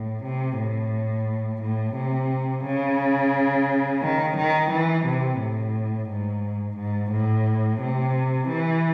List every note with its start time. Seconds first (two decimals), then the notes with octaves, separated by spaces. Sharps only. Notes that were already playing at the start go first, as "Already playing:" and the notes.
Already playing: A2
0.23 C3
0.58 A2
1.61 A2
1.96 C3
2.65 C#3
4.02 D#3
4.37 D#3
4.71 E3
5.06 C3
5.39 A2
6.09 G#2
6.77 G#2
7.11 A2
7.81 C3
8.48 E3